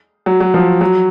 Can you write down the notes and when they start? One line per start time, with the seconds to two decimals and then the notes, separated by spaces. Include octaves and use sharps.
0.26 F#3
0.40 F#3
0.54 F3
0.81 F#3